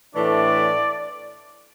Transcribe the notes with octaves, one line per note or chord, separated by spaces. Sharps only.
A2 E3 A3 D4 D5